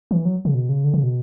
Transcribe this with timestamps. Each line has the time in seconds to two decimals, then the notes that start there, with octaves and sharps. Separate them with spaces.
0.11 E3
0.25 F#3
0.45 C#3
0.54 B2
0.69 C#3
0.84 D3
0.94 C#3
1.03 B2